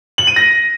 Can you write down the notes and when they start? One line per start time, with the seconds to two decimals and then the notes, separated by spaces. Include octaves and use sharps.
0.18 F#7
0.27 D#7
0.36 A#6